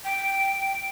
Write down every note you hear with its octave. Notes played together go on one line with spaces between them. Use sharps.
G5